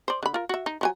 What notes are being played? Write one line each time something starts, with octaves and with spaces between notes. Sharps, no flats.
C5 D5
D3 B5
F4 A#4
F#4 E5
D#4
F3 F#3 G#5